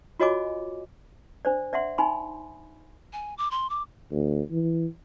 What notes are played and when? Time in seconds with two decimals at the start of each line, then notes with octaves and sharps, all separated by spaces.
0.20 F4 F#4 C#5 D#5 G#5 D6
1.45 D4 C5 D5
1.73 D5 E5 F#5 C6
1.98 D#4 G#5 B5 C6
3.13 G#5
3.38 D6
3.51 C6
3.70 D6
4.12 D2
4.51 E3